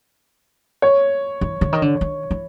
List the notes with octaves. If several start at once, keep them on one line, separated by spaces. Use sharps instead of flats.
C#5
E3
D3
D#3
D3
D#3
E3